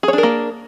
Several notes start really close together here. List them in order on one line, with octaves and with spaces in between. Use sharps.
G#4 C#5 D4 A#4 A#3